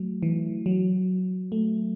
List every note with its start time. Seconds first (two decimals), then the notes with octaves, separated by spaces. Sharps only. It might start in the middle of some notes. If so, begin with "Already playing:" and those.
Already playing: F#3 A3
0.23 E3
0.66 F#3
1.52 A3